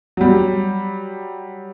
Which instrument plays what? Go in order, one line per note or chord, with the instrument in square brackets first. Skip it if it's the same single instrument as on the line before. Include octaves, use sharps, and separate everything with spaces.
[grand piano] F#3 G3